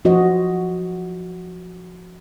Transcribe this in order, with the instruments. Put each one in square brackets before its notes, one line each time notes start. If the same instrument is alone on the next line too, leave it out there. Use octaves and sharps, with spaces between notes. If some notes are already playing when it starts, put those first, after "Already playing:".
[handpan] F3 F#4 C5 D#5